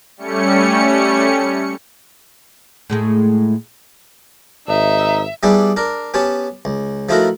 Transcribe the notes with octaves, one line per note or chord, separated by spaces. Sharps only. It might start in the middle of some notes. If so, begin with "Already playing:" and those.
G3 A3 C#4 C#7
A2 G#3 A3
G#1 D#4 E5
G3 B3 D4 E4 G4 G#4
D4 A#4
B3 C#4 G4 C#5 A5
C#2
F3 A3 D#4 E4 F#4 A#4